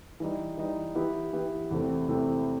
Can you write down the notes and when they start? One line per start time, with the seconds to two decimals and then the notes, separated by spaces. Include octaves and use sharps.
0.20 E3 G3 D#4
0.57 E3 G3 D#4
0.95 E3 B3 E4 G4
1.33 E3 B3 E4 G4
1.71 E2 C3 E3 A3 C4
2.08 E2 C3 E3 A3 C4